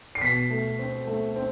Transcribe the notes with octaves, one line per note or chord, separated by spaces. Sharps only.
C7
B2 B6
A3
C4
A3
C4